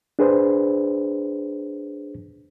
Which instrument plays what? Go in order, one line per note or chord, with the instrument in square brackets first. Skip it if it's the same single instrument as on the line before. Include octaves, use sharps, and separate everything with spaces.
[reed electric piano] D4 G#4 B4 C5